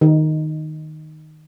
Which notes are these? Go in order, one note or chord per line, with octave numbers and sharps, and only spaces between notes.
D#3 D#4